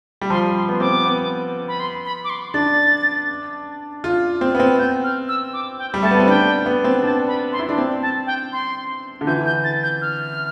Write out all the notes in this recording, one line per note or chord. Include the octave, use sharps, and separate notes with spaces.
G3
F3 C6
G3
C6
B3
C4 D6
B3
B3
B5
C6
B5
D6
C6
D4 A6
F4
C4
B3
C4
G6
F6
E6
D6
G5
G3
A3 A5
B3
C4
D4 G5
B3
C4
D4 A5
B5
C6
E4
D4
C4
A5
G5
C6
D3
E3 G6
G6
A6
G6
F6